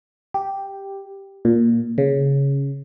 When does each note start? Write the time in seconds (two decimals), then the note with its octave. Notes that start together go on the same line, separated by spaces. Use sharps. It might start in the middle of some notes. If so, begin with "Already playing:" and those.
0.34 G4
1.45 A#2
1.98 C#3